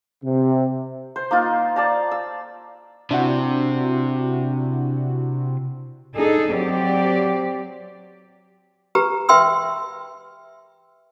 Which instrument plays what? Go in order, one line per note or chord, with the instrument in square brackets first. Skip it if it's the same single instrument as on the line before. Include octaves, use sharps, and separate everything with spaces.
[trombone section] C3
[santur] C5
A#3 D#4 F4
D5 A5 A#5
E6
[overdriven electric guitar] C3 [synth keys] D4 E4 F#4
[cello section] D4 D#4 G#4 A4
F#3 C4 G4 D5
[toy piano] G4 B4 A#5
B4 E5 G5 C6 E6